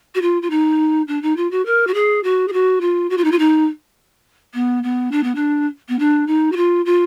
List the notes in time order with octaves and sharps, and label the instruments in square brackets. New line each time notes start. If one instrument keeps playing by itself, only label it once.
[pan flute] F#4
F4
F4
D#4
D4
D#4
F4
F#4
A#4
F#4
G#4
F#4
G#4
F#4
F4
F#4
F4
D#4
F4
D#4
B3
B3
D4
B3
D4
B3
D4
D#4
F#4
F4
F4